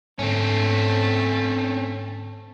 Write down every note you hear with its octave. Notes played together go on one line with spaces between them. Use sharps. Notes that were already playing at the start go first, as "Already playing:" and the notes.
G#2 D3 A3 C4 C#4